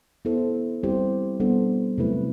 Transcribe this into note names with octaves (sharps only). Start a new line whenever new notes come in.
B3 E4 A4 C5
G3 C4 E4 G4 C5
G3 B3 D4 A4 C5
C3 F#3 A3 E4 B4